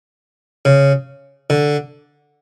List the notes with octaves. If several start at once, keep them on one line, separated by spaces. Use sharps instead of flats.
C#3
D3